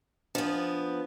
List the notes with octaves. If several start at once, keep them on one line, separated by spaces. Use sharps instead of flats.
F3 B3 D4